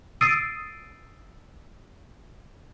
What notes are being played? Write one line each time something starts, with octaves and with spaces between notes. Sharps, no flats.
D#6 E6 A6 C7 D7 D#7